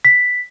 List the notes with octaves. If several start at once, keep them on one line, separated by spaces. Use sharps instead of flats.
B6